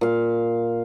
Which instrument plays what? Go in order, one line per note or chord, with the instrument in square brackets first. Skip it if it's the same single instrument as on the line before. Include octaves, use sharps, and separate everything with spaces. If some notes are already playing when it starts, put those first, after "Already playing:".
[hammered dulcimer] A#2 F5